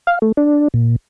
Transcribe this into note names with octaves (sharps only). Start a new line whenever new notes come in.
F5
A3
D4
A#2